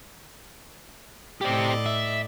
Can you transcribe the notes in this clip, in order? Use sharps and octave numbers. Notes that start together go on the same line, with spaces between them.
A2 C4 G4 D5 D#5
E5